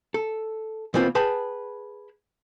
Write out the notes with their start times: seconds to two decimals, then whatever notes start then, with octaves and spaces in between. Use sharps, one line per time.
0.14 A4
0.94 B2 E3 A#3 C4 F4 B4
1.15 G#4 B4 G5 A5 B5